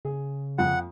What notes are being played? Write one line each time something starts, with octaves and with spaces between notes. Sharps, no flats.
C#3 G#4
F2 F3 F#5